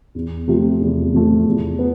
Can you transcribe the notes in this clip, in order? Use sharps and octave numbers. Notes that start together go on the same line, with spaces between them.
E2
C3 F3 A3
E2
C3 F3 A3
E2
B3